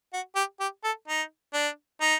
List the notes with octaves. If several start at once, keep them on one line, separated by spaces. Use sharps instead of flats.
F#4
G4
G4
A4
D#4
D4
D#4